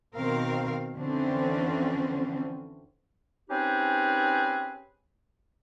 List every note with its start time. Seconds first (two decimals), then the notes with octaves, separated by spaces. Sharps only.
0.15 B2 D#3 C4 A#4 F5
0.95 F2 D3 E3 C4 C#4
3.50 C4 C#4 D#4 G4 G#4 B4